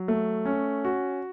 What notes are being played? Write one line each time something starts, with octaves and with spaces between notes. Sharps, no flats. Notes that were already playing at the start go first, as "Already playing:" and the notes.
Already playing: F#3
A3
C#4
F#4